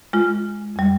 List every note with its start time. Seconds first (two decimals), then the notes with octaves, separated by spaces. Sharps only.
0.13 G#3 F4
0.76 F2 G3